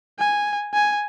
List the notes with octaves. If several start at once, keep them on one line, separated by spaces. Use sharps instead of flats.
G#5
G#5